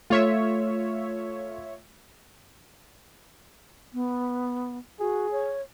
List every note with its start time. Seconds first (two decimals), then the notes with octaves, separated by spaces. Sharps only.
0.10 A3 F4 C#5 E5
3.94 B3
5.00 F#4 G#4
5.31 C#5